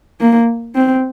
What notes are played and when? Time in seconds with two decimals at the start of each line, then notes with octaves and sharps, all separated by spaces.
0.21 A#3
0.75 C4